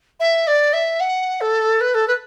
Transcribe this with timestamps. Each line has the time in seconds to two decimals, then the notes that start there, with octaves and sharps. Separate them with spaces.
0.20 E5
0.47 D5
0.73 E5
1.00 F#5
1.41 A4
1.81 B4
1.94 A4
2.08 B4